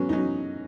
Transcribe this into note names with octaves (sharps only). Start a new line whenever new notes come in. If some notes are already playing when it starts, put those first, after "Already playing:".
Already playing: G#2 F#3 B3 C#4
D#4
F#3 C#4